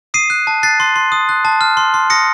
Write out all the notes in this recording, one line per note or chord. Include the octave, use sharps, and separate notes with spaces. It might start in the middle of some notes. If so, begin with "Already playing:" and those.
D#6 C7 D#7
F#6
A5
F#6 A6 C7
C6
C6
D#6
F#6
A5
F6
C6
C6
D#6 A#6 C#7